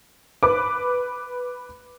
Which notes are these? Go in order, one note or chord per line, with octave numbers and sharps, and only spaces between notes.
B4 D6